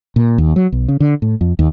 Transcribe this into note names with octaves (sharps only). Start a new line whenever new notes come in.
A#2
D#2
F#3
B1
C#3
D3
A2
F2
D#2